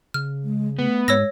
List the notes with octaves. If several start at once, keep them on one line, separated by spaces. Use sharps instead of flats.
C#3 F6
G#3
A3 B3
G#2 G#3 C#5 E6 A#6